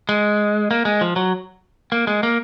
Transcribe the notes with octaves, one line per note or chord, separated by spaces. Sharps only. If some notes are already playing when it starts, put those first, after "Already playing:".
G#3
A#3
G#3
F3
F#3
A#3
G#3
A#3